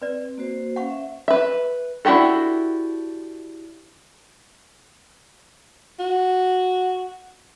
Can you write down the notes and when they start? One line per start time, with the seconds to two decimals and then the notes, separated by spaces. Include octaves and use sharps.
0.02 C4 B4 D5
0.38 A#3 F#4 C5
0.76 C#4 F5 F#5 C#6
0.90 E5
1.28 B4 E5
2.05 D4 E4 F#4 G4 A4
5.99 F#4